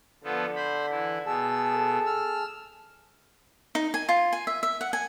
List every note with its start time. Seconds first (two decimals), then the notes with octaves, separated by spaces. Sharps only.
0.24 D3 F3 B3 A4
0.56 C5 B5
0.91 E3 E4
1.26 B2 G#4 A5 E6
1.74 A4
2.06 E6 F6
3.75 D#4
3.94 G#5
4.09 F4
4.33 G#5
4.47 E5
4.63 E5
4.81 F#5
4.93 G#5